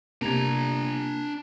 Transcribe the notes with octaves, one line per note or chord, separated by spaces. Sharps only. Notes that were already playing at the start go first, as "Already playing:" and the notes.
C3 A#3 D4 A#5 G#6